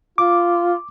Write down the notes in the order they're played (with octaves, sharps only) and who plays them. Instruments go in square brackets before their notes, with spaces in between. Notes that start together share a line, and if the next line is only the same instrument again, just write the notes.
[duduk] F4 [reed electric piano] D6